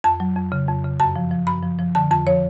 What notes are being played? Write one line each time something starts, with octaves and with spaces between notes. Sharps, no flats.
F2 A5
F#3
F2
C#3
F2
C#3
F#2 A5
F3
F3
F#2 B5
F3
F3
D3 A5
F2 A5
F3 C#5